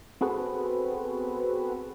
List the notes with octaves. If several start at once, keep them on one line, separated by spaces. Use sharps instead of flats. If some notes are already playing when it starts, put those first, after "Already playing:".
B3 C4 F#4 G#4 A4 B4